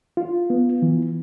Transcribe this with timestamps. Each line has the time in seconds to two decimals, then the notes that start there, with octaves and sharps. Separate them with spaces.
0.17 F4
0.50 B3
0.82 E3